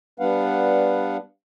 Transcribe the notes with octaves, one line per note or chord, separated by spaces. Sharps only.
G3 B3 D4 B4 F5 F#5